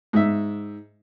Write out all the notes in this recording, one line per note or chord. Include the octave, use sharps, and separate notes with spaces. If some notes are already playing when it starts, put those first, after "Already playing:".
G#2 E5